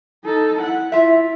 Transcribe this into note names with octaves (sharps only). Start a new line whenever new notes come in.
D#4 A4
E4 F#5
E4 F4 E5